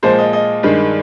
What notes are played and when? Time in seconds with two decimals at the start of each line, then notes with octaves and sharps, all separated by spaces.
0.03 A#2 F3 G#3 C5
0.18 D#5
0.33 D#5
0.63 G2 D#3 G#3